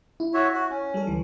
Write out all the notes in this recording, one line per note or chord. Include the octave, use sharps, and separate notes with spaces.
E4
F#4 C#5 E5
F#4
C#4
G3 A4
D2 E3